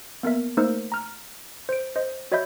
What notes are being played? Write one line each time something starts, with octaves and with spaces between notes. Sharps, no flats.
A#3 B3 A#4 E5
A3 A#3 D#4 A#4 C5 E6
A#5 F6
C5 D7
C5 D#5
F#4 C#5 D#5 E5 B5 G6